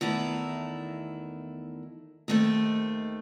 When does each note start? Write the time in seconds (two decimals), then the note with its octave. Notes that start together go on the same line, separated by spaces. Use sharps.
0.01 E2 D#3 A3 E4
2.28 D#2 D#3 A3 C4